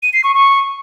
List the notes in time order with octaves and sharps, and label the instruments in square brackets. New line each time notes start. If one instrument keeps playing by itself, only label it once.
[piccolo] D#7
C7
C#6
C#6